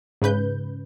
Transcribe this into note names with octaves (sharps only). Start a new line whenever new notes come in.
G#2 C#3 B4 G6